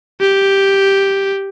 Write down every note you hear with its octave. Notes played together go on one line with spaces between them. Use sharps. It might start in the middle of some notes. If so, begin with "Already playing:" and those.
G4